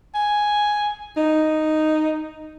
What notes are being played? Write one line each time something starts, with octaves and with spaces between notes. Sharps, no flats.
G#5
D#4